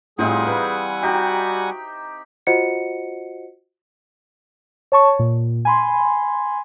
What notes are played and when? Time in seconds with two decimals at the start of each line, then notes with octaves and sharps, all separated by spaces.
0.19 A2 G3 C4 D#4 F4 G#4 F#5 G#5
0.46 E3 B4
1.03 D#4 F#4 G4 G5 A#5
2.47 F4 F#4 C5 D#5 F#5 C#7
4.92 C#5 A5 C#6
5.19 A#2
5.65 G#5 B5 C6